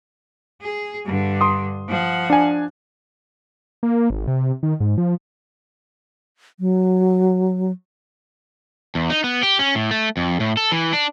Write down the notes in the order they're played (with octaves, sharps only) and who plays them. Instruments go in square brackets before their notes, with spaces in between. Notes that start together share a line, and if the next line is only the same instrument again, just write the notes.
[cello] G#4
G2 D3
[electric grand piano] C6 D#6
[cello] F3 F#5
[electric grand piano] D4 G#5
[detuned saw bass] A#3
G#1
C3
D#3
G#2
F3
[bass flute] F#3
[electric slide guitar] E2
D#4
B3
G4
C#4
A2
A3
F2
A2
A4
E3
D4